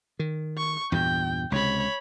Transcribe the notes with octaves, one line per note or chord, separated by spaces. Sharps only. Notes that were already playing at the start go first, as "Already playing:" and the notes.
D#3
C#6
E2 G2 A#2 G5
C#2 C3 C#5 B5